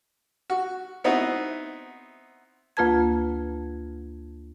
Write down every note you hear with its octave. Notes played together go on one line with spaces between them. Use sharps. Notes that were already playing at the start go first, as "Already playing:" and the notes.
F#4
B3 C4 D#4 E4 F#4
D2 A#3 F4 B4 A5 G#6